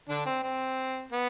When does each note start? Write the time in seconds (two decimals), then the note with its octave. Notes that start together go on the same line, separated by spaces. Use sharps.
0.09 D3 D4
0.26 C4
0.43 C4
1.12 B3